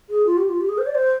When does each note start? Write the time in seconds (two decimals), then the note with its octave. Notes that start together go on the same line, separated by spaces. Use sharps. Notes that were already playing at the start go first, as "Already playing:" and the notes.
0.10 G#4
0.26 F4
0.38 G4
0.49 F4
0.61 G4
0.69 G#4
0.78 C5
0.87 D5
0.95 C5